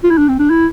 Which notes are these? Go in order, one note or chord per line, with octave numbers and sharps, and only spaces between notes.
F4
E4
D4
C4
D4
E4